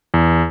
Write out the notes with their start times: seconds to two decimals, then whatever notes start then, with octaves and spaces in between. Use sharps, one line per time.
0.14 E2